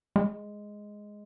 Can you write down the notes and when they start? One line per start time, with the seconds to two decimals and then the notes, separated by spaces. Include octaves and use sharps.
0.16 G#3